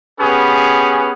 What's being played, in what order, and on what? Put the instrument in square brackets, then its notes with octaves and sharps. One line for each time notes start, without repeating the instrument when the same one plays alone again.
[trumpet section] B3 C#4 G4 G#4 B4